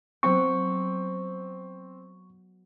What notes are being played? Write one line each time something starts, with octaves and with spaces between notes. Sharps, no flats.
F#3 B3 C4 F#5 C#6